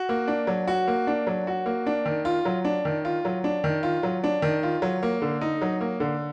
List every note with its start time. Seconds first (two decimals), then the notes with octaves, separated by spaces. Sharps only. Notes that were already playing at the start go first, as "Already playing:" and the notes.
Already playing: F#4
0.09 A#3
0.28 D4
0.47 F#3
0.68 F#4
0.87 A#3
1.07 D4
1.27 F#3
1.47 F#4
1.66 A#3
1.86 D4
2.06 D#3
2.25 F4
2.45 F#3
2.65 D4
2.85 D#3
3.05 F4
3.25 F#3
3.44 D4
3.64 D#3
3.83 F4
4.03 F#3
4.24 D4
4.42 D#3
4.63 F4
4.82 F#3
5.03 A#3
5.22 D3
5.41 D#4
5.62 F#3
5.81 A#3
6.00 D3